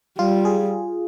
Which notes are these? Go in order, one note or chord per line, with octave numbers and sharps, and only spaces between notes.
G3 F4
G#4